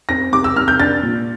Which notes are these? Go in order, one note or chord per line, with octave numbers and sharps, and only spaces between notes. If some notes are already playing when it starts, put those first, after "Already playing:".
C4 A#6
C3 D6
E6
C3 F6
G6
D4 A6
A#2